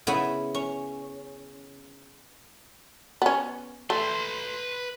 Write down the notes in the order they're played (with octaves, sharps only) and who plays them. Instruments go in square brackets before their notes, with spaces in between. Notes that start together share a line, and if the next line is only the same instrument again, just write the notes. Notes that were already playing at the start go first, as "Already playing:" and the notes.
[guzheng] C#3 B3 E4 G#5
C#4
[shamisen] B3 C#4
[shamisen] A3 [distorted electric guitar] B4 C6